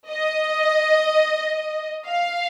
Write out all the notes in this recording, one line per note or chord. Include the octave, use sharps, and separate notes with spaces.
D#5
F5